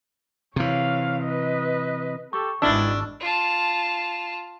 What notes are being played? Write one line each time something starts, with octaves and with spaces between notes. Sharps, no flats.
C3 E3 C#5 F5
B4 D#5
G4 A4 C#6
G#1 B2 D#3 G#3 D4 E4 E6
F4 A5